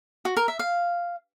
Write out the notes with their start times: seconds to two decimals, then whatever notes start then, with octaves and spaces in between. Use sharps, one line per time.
0.25 F#4
0.37 A#4
0.48 E5
0.59 F5